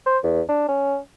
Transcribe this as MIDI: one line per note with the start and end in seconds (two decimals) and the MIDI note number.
0.06 0.18 72
0.24 0.41 40
0.49 0.66 62
0.68 0.97 61